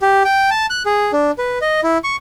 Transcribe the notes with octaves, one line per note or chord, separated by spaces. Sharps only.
G4
G5
A5
F#6
G#4
D4
B4
D#5
E4
C#6